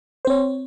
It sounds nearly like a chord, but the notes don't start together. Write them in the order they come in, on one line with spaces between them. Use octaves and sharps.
C5 C4 C#5